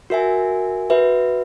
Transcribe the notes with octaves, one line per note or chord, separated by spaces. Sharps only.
F#4 A#4 E5 G#5
F#4 B4 E5